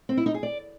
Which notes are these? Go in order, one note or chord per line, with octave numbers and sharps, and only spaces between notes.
C4
E4
D#4
G#4
D5